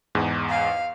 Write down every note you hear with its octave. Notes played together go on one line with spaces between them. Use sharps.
E2 G#2
F5